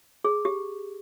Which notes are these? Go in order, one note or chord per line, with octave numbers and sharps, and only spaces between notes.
G#4
G4